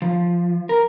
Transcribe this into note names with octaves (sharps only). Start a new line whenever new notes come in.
F3
A#4